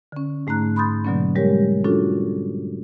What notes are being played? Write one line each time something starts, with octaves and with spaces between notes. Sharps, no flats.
D3 C#4
G#2 A3 D#4 A#5 F#6
B5 C6 D#6 G6 A6
B2 D3 F#3 A#3 C#4
G3 G#3 G4 A#4 C#5
C#4 D4 F4 F#4 A4